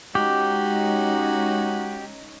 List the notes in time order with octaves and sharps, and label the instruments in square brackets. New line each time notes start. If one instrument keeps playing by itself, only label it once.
[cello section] G#3 C#4 D#4 [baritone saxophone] F#4 [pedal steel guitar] G4